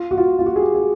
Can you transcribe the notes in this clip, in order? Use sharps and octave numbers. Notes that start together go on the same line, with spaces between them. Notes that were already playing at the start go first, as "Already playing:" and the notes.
Already playing: F4
F#4
F4
F4
F#4
G#4
G4
G#4